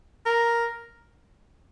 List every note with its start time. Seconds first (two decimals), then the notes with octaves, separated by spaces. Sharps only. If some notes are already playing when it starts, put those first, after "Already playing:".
0.26 A#4